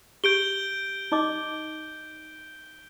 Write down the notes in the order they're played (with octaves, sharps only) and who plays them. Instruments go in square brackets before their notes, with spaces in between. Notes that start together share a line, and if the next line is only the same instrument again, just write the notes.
[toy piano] G4 [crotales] G6 D7 G7
[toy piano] D#4 D#5 D6